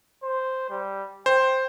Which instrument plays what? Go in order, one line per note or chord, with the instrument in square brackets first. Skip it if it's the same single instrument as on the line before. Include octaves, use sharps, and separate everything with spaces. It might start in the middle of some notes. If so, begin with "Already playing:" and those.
[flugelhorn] C5
G3
[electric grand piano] C5 [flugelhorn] G5